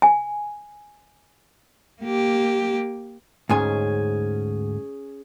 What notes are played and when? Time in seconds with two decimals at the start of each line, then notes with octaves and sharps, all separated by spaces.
0.02 G#5
2.02 A#3 G4
3.49 D2 G#2 C#4 G#4 G#5